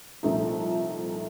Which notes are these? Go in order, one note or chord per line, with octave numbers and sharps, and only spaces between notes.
C2 A#2 F3 A3 D#4